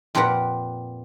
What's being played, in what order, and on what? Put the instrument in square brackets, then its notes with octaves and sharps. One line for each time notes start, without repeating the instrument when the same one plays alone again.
[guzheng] F2 A#2 G4 A#4 B4 F#5